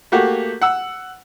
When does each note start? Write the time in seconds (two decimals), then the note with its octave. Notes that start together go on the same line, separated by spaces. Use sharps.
0.12 A3 A#3 F#4 G4
0.62 F#5 E6